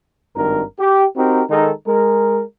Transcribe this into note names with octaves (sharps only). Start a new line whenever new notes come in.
G#1 G2 D#3 A#4
G4
C4 D#4 F#4 G4 A#4
D#3 G#3 D#4 A4 A#4
G#3 A#4